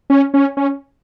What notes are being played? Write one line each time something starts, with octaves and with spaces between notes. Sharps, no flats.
C#4
C#4
C#4